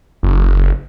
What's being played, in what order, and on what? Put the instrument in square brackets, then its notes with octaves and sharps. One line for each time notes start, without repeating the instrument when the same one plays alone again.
[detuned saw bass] F#1